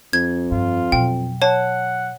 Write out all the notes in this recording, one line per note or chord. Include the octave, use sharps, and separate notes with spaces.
F2 G#6
G2 F4
B2 F#3 G5
C#5 F#5 A5